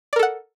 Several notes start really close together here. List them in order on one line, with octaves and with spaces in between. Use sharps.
D5 A#4 A4 F#5